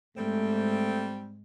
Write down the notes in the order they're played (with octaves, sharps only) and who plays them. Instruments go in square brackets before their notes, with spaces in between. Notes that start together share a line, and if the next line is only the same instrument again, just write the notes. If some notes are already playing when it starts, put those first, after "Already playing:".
[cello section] G#2 [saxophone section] G3 C4 [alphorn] A3